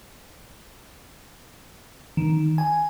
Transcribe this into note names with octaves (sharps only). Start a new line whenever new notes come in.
D#3
G#5